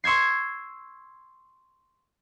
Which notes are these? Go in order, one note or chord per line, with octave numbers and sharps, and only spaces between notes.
C6 C#6 E6 G#6 C7